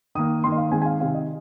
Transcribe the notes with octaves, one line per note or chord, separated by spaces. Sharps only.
D#3 A#3 D#6
D#3 A#3 C6
D#5
F5
D#3 G#3 C4 G#5
G#5
F5
C3 D#3 C4 F5
D#5